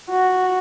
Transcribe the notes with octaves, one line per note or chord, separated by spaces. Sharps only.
F#4